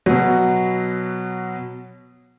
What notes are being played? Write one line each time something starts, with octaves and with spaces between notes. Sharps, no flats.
B2 F#3